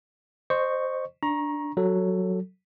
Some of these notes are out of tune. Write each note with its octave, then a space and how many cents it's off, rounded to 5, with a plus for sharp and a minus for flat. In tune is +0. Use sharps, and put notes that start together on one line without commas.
C5 +0 D#5 -25 C#6 +0
D4 +0 A#5 +20 C#6 -20
F#3 +0 A4 +10